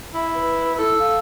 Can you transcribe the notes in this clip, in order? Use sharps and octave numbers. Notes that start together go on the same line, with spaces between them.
E4 E5
B4
E4 A4
F5